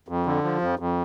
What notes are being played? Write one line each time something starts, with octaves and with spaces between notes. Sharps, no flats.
F2
D3
F3
F2
F2